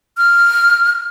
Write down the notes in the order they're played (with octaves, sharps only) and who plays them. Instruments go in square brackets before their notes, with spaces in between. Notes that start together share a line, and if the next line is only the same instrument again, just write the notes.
[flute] F6